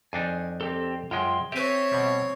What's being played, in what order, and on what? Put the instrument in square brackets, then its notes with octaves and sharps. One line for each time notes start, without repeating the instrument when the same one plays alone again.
[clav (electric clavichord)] F2 D4 D#4 [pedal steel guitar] G#5
[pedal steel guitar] C4 G4 A4
[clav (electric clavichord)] F#2 G#3 [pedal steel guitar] F4 G5 C6
[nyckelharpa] C4 C#5 [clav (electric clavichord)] G4 G#5 [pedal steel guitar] E5
[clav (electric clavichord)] B2 G3